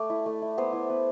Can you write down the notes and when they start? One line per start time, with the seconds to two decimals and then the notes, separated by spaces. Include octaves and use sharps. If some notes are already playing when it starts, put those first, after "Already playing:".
Already playing: A3 D5
0.10 E4
0.26 A3
0.42 E4
0.58 B3 C5
0.73 E4
0.90 B3